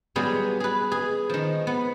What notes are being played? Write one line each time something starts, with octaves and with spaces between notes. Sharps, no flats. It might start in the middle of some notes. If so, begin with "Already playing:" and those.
F#3 G3 B3 F4 G#4
G#4 B4
G#4
D#3 F3
B3